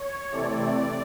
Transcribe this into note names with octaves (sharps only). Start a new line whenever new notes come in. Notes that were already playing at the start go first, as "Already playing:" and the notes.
Already playing: C#5
C3 E3 A3 C4 D5